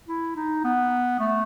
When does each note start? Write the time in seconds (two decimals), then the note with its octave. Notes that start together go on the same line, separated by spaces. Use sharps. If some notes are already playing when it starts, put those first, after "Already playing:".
0.08 E4
0.36 D#4
0.64 B3
1.20 A3